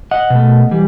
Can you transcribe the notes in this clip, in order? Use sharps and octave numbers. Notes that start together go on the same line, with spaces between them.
D#5 F#5
B2 A3
E3 G3